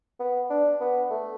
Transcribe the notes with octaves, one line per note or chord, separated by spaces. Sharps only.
B3
D4
B3
A3